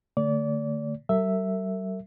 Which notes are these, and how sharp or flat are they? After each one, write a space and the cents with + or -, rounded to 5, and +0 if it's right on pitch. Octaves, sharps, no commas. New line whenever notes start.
D3 +10 A3 +35 D5 -30
G3 -45 A#4 -40 E5 +0